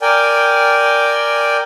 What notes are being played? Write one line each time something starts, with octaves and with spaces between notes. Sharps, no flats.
A#4 D5 G5 G#5